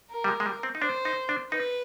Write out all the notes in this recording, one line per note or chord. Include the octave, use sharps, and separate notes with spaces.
A#4
G3
G#3
G#3
G3
C4
D#4
D4 C5
D#4
D4
D#4 B4